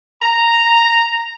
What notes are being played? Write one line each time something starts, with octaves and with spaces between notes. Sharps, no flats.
A#5